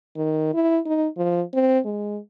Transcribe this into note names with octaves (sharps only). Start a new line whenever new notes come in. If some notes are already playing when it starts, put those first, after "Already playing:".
D#3
E4
D#4
F3
C4
G#3